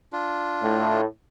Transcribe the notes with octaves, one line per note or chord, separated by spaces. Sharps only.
D4 F4
A2